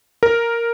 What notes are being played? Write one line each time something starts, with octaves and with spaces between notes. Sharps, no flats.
A#4